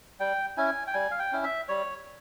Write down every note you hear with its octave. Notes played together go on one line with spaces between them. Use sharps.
G3 G5
C#4 E4 G#5
G5
G3 G#5
F5
G5
C#4 E4
E5
G3 C#5